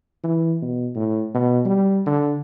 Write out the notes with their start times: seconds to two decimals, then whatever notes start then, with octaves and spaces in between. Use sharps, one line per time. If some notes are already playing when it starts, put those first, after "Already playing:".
0.24 E3
0.62 B2
0.95 A2
1.34 B2
1.65 G3
2.06 D3